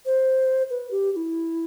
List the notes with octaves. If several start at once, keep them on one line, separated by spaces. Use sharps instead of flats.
C5
B4
G4
G4
E4